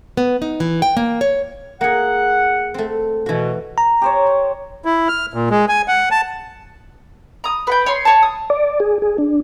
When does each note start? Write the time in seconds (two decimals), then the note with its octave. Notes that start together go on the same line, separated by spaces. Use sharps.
0.17 B3
0.42 D#4
0.60 E3
0.82 G5
0.97 A#3
1.21 C#5
1.81 A#3 G#4 F#5
2.74 A3 C4
3.26 B2 E3 F#4
3.78 A#5
4.02 G4 C5 C#5
4.85 E4
5.08 F6
5.34 A#2
5.50 G#3
5.69 G#5
5.88 F#5
6.11 A5
7.44 A#5 D#6
7.67 B4 F#5 G5
7.86 C#5 C6
8.05 C#5 A5
8.23 D#6
8.50 D5
8.80 G#4
9.02 G#4
9.18 D4